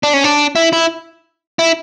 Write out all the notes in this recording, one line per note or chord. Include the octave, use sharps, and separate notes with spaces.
D4
C#4
D4
E4
E4
E4